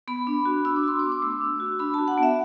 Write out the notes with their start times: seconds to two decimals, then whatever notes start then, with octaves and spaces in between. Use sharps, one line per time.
0.08 B3 B5
0.27 D4
0.45 F#4
0.65 D4 E6
0.76 D6
0.84 F#4 C6
0.99 D6
1.03 B3
1.12 D6
1.22 A3 E6
1.41 D4
1.60 F#4
1.79 D4 B5
1.94 F#4 A5
2.08 F#5
2.18 B3
2.23 E5